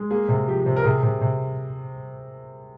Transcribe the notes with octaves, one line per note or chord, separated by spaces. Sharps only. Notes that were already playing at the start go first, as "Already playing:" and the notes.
Already playing: G#3
A#3 G#4
C3
F3 G4
C3
A#4
C3 G#4
C3
C3